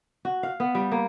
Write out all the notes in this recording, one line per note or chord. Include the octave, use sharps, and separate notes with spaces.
F#4
F5
B3
G3
A#3